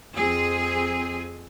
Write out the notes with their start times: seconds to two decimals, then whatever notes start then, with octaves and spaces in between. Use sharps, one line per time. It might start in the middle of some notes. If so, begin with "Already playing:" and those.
0.16 F2 C4 G#4